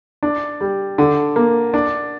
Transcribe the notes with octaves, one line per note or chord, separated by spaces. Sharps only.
D4
G3
D3
A#3
D4